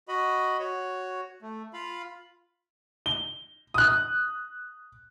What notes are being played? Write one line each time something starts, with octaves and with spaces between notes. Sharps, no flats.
F#4 D#5 B5
F#4 C#5
A3
F4 F5 B5
G7
D#6 F#6